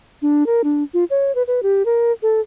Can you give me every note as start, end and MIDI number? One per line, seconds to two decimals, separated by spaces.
0.22 0.46 62
0.46 0.62 70
0.64 0.83 62
0.94 1.04 65
1.10 1.34 73
1.35 1.43 71
1.48 1.63 71
1.63 1.85 67
1.86 2.12 70
2.22 2.40 69